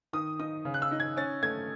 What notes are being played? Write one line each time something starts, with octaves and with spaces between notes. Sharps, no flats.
D#3 D#6
D#4 D#6
C#3
F#6
E6
D#4
G#6
C#4 A6
A3 G#6